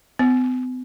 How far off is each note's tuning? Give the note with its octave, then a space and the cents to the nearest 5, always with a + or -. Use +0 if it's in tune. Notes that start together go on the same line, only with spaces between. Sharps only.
B3 +45